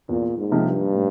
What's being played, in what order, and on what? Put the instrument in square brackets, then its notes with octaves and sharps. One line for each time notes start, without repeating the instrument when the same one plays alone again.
[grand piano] E2 [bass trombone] A#2
[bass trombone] G#2
[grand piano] C3 F3 A#3 D#4
[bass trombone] G2
[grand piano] A2